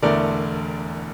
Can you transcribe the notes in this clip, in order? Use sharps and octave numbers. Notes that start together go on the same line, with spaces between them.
E1 E2 D3 A3 A#4 D5